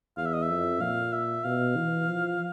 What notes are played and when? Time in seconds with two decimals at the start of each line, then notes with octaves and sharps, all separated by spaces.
0.17 E2 F5
0.26 E5
0.33 D#5
0.42 E5
0.49 F2
0.81 A#2 F5
1.13 E5
1.44 B2 F5
1.76 E3
2.08 F3